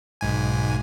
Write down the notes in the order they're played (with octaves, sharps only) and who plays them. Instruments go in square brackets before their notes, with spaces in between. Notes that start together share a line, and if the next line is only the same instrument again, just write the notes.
[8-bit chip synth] B1 G#2 G#5